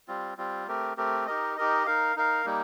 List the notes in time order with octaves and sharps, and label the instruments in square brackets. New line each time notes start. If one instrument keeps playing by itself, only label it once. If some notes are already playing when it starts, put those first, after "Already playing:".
[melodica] G3 C4 F4
G3 C4 F4
A3 C4 G4 A#4
A3 C4 G4 A#4
D#4 G4 A#4 D#5
D#4 G4 A#4 D#5
D#4 A#4 F5
D#4 A#4 F5
G3 A#3 D#4